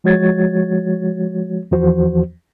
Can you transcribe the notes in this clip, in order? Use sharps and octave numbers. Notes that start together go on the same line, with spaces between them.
F3 G#3 F#4 C#5 G#6 A6
E2 E3 F3 F#4 C5